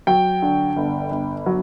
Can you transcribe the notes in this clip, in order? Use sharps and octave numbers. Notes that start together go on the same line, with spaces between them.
F#3 G5
D3
G1
G1
F#3